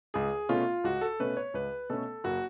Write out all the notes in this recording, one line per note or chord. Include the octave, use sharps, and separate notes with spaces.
C#2 G#4
B2 A3 C#4 F4
C#2 F#4
A4
B2 A3 C#4 B4
C#5
C#2 B4
B2 A3 C#4 A4
F#1 F#4